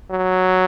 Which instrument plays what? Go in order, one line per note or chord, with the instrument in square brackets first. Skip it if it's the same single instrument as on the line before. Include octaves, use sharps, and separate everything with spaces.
[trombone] F#3